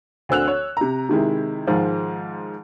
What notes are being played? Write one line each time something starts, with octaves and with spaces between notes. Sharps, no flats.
D2 D3 C4 E6 F#6 F7
C#5
C3 A#5
C3 D#3 G#3 E4
G#2 D#3 F3 G#3